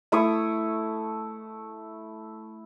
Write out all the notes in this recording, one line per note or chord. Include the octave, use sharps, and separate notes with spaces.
A3 E4 C#6 D#6